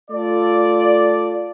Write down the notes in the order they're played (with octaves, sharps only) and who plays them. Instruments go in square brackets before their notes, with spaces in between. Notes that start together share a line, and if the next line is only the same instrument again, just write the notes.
[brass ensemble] A3 F4 A4 D5